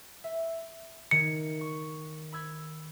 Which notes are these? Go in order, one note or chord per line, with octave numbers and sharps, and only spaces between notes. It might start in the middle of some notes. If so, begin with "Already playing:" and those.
E5
D#3 G#6 C#7
C#6
B5 E6 G#6